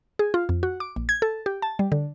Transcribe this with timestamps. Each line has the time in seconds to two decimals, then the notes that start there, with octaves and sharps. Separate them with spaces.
0.19 G#4
0.34 F4
0.49 F2
0.63 F#4
0.80 D6
0.96 A#1
1.09 G#6
1.22 A4
1.46 G4
1.62 A5
1.79 G3
1.92 D3